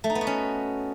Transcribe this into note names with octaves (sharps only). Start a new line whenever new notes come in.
A3
D#4
B3
F#4
C#4